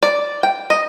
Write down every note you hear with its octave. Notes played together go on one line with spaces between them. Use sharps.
D5
G5
D#5